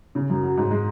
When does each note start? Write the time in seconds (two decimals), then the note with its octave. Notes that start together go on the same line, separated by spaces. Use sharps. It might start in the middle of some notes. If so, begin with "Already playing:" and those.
0.15 C#3
0.30 F#2
0.43 F#3
0.57 G#2
0.71 G#3